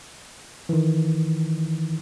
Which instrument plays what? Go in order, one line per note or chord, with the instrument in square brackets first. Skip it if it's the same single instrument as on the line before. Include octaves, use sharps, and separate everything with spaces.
[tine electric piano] D#3 E3